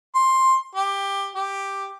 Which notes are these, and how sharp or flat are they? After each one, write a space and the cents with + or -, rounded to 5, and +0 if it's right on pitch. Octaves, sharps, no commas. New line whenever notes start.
C6 +10
G4 +15
G4 +5